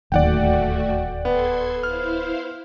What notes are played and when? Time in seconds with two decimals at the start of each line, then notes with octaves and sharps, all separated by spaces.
0.12 D1 D#2 A3 F#4 D5 F#5 G5
1.25 B3 A4 C6 G#6
1.83 E4 C5 F5 F6